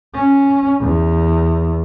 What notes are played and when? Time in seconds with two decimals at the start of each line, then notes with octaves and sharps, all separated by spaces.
0.15 C#4
0.81 E2